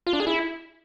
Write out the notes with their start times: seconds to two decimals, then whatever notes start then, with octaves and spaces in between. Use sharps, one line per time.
0.07 F4
0.13 D4
0.20 G#4
0.27 E4